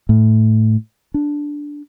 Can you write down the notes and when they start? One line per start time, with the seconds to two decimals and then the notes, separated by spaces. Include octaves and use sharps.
0.09 A2
1.14 D4